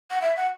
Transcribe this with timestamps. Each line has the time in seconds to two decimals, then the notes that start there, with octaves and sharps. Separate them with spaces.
0.11 F#5
0.22 E5
0.37 F#5